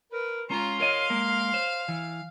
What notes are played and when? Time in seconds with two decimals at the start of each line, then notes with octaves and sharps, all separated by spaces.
0.12 A#4 B4
0.50 G#3 C#4 F4 A#5 C6
0.80 A#4 C#5 D#5 F5
1.10 G#3 A#3 A#4
1.54 C5
1.88 E3